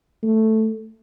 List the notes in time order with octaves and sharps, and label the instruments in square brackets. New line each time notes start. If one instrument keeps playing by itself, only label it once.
[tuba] A3